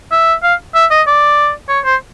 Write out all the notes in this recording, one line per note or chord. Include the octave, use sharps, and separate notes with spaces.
E5
F5
E5
D#5
D5
C#5
C5